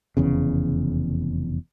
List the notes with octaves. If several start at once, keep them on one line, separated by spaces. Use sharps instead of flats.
F1 E2 C#3